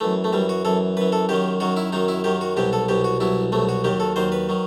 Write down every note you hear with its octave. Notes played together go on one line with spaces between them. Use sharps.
F#2 E3 A3
A3
F#2 E3 G3
F#4
F#2 E3 A4
F#2 E3 B4
A4
F#2 D#3 F#3 G4
F#2 D#3 F#3 F#4
E4
F#2 D#3 F#3 D#4
E4
F#2 D#3 F#3 G4
F#4
C2 B2 F#3 G4
A4
C2 B2 F#3 G4
F#4
C2 B2 F#3 E4
C2 B2 F#3 A3
F#4
D#2 D#3 F#3 G4
A4
D#2 D#3 F#3 C5
B4
D#3 F#3